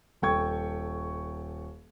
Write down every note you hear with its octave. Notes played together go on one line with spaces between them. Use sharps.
D#1 A4 G5 C#6 G#6